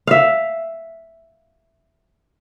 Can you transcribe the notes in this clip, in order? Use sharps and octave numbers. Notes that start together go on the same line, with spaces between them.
E5 F5